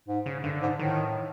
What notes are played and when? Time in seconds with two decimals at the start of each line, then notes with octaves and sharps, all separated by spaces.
0.08 G#2
0.26 C#3
0.43 G2 D3
0.62 G#2
0.79 A2 D#3